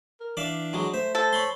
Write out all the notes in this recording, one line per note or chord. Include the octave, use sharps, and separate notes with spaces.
A#4
E3 D4 D5 E5 F5
D3 F#3 G#3
A3 C5 E5
A4 C5
C#5 B5 C6